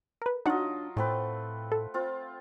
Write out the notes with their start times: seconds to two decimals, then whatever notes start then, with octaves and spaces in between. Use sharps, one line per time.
0.22 A#4 B4
0.46 F#3 D4 D#4 F4 F#4 D#5 F#5
0.97 A2 A3 C4 B4
1.72 A4
1.94 C4 F4